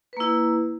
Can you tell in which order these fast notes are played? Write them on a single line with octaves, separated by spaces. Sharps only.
B4 A#3 E4